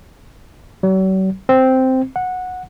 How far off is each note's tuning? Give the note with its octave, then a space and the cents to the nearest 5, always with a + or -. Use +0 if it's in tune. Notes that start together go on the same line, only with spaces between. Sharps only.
F#3 +45
C4 -5
F#5 -15